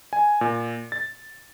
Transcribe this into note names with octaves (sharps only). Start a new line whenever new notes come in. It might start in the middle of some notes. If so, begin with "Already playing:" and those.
G#5
A#2
A6